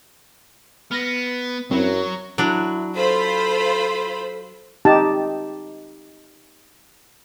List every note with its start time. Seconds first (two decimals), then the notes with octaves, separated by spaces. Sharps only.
0.91 B3 F6 A#6
1.71 F#2 F#3 C4 E4
2.38 F#3 D4 E4
2.95 F4 A4 C5 B5
4.85 D#4 G4 A5